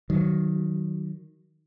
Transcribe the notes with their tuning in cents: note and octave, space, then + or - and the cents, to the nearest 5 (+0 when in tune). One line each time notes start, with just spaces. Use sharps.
D#3 +0 F#3 +15